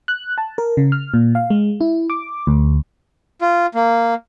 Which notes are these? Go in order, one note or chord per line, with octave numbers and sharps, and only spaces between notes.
F#6
A5
A#4
C#3
F6
A#2
F5
G#3
E4
D6
D2
F4
A#3